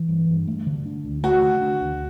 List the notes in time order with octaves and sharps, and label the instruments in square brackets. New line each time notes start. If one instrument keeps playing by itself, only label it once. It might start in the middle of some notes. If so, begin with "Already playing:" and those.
Already playing: [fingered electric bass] E3
G2
G2
A3
D3
D4
D2
[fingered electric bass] A3 [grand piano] F#4
[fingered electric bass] D3
D4
D2